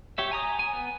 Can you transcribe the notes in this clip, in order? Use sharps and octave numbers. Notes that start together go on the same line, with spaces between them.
G4 C#5 E5
G#5 A#5 D#6
G#5
B3